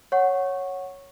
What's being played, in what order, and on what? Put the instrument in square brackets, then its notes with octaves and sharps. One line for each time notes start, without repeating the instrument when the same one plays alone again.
[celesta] C#5 F#5 C#6